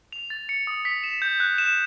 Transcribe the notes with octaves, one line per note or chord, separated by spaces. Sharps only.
F7
A6
C#7
D#6
B6
E7
G6
F#6
E7